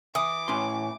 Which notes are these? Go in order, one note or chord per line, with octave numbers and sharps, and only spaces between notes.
E3 D6 D#6
A2 C#4 C6